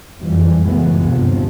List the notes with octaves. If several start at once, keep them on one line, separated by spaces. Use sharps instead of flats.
F#1 F2 E3 G3
C#2 F#2 A2 E3 G#3 B3
G1 D#2 C3 F3